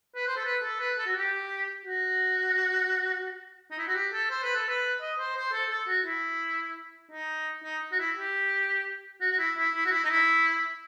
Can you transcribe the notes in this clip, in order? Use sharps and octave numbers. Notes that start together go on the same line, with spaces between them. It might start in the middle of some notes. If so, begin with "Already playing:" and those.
B4
C5
A4
B4
A4
B4
A4
F#4
G4
F#4
D#4
E4
F#4
G4
A4
C5
B4
A4
B4
D#5
C5
C5
A4
A4
F#4
E4
D#4
D#4
F#4
E4
G4
F#4
F#4
E4
E4
E4
F#4
E4
D#4
E4